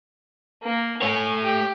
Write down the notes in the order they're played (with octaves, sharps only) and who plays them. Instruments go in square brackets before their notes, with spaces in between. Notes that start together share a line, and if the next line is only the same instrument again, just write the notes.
[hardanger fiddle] A#3
[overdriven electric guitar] A3 C#5 [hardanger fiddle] G#5
[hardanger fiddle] G4